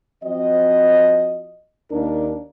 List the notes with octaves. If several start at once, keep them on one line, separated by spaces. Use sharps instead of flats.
F3 C4 F#4 D#5
D#2 A#3 D4 D#4 A#4